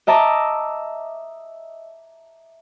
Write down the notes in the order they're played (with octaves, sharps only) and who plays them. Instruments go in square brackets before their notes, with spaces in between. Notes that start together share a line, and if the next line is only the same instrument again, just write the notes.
[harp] D#5 E5 A5 A#5 D6